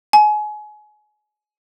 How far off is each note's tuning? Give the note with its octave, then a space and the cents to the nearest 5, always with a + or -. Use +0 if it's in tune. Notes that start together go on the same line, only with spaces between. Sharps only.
G#5 +30